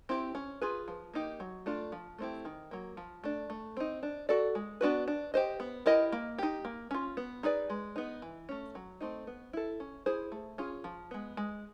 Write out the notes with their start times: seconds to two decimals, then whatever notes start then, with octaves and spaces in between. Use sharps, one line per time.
0.09 C4 E4 G4
0.35 C#4
0.62 F4 G#4 B4
0.88 F3
1.14 A#3 D#4 G4
1.40 F#3
1.66 A3 D4 F4
1.92 F3
2.18 A3 C4 E4 G4
2.45 D#3
2.71 F#3 A#3
2.97 F3
3.24 A3 D4
3.50 A3
3.77 C4 D#4
4.03 D4
4.29 F#4 A4 D5
4.55 G#3
4.81 B3 D4 F#4 B4
5.08 D4
5.34 G4 C5 D#5
5.60 B3
5.86 E4 G4 A#4 D#5
6.12 A#3
6.38 D#4 G4
6.65 A#3
6.91 C#4 F4
7.17 B3
7.43 D#4 G#4 B4 D5
7.70 G#3
7.96 B3 D#4
8.22 E3
8.49 A3 C#4
8.75 F#3
9.01 A3 C4 D#4
9.27 B3
9.53 E4 A4
9.80 C#4
10.06 E4 G#4 C5
10.32 A3
10.58 C#4 F4 G#4
10.84 F3
11.11 G#3 B3
11.37 G#3